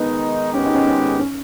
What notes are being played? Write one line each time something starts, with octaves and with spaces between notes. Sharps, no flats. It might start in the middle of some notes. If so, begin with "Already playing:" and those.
Already playing: D#3 G#3 B3 D#4
G#2 D#3 G#3 B3 C#4 G4
D#4
C#4
C#4
C#4